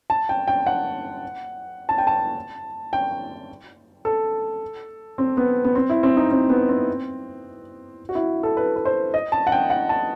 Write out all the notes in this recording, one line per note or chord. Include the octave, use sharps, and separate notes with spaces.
A5
G5
G5
F#5
A5
G5
A5
G5
A4
C4
B3
B3
C4
E4
C4
D#4
C4
B3
C4
F#4
E4
A4
B4
B4
C5
D#5
A5
F#5
G5
F#5
A5